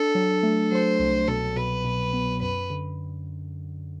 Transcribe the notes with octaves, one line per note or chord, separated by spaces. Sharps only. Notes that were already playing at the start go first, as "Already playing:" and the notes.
Already playing: D4 A4
F#3
A3
F#3 C5
C2
B2 A4
B2 B4
B2
B3
F#2 B4
D3